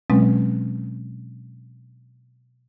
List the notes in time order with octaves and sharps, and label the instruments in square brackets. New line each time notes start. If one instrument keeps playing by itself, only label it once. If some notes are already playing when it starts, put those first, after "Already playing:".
[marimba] B2 F#3 G#3 C4 C#4